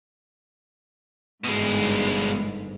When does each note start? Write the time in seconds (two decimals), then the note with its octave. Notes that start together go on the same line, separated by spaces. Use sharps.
1.44 G1 G#2 B2 G#3